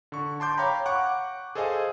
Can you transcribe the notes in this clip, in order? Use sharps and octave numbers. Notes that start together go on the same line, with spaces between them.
D3 C#6
A5 C6 D6 G6
C#5 F5 G5 A#5 B5
F#5 C#6 D6 F#6
G#4 A4 C5 D#5 F5 G#5